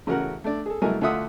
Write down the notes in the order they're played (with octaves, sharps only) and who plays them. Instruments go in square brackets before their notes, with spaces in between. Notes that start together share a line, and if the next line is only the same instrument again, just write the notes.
[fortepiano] A1 C#3 F#4 A#4 F#5
A3 D4 D5
G#4 A4
C2 F#3 G#3 A3 A#4 G#5
D2 D3 F4 E5 F#5 D#6